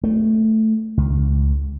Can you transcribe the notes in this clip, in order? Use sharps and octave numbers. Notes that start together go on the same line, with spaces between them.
A3
C#2